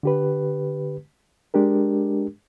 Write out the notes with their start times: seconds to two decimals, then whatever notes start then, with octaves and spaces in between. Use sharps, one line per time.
0.03 D3 G4 B4
1.54 G#3 D4 G4 A#4